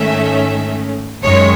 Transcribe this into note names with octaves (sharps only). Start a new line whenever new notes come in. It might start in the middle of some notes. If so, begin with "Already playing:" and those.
Already playing: G#2 D#3 A3 C#4 E5
F#2 D#3 G#3 C#5